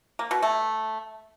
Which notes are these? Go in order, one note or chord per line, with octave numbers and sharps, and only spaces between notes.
A#3
B2
A3